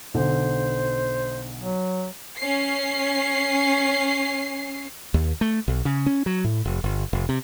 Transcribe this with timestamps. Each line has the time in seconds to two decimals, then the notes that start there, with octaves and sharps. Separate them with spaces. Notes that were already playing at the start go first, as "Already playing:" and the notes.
0.14 B1 D3 C5
1.60 F#3
2.38 C#4 C7
5.14 D#2
5.41 A3
5.68 B1
5.85 C#3
6.06 C#4
6.26 F#3
6.44 A2
6.65 F1
6.84 G1
7.13 F1
7.29 C3